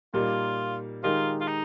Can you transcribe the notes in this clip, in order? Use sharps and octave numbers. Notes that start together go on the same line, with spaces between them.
A#2 G3 A#3 D#4 F4
D#3 G#3 D#4 F4 G4 A#4
F4
D#4